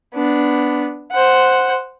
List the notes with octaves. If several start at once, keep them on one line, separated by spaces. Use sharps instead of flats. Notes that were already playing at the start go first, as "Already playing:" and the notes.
B3 D4
C5 F#5